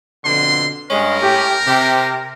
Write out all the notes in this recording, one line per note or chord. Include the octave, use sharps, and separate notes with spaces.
F2 B2 D3 C6
G2 G#3 C#4 A#4
A2 G4
C3 G4